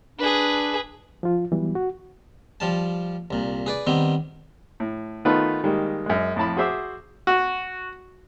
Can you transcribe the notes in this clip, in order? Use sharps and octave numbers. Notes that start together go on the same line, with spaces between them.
D4 G#4 B4
F3 F4
E3 F#3 G3 B3
F#4
F3 G3 A5
C2 A#2
G#4 B4 D5
D#3 G3 B3 C4
A2
D#3 A3 B3 D#4 F4 B4
D#3 G3 G#3 A#3
F#2 G#3
F2 A2 A5 B5
F#4 G#4 C5 E5 D6 E6
F#4